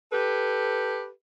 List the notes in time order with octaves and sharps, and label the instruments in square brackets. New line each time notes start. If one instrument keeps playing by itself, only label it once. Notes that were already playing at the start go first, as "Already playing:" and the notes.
[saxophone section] G4 A4 B4